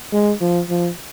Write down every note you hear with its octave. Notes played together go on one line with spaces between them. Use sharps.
G#3
F3
F3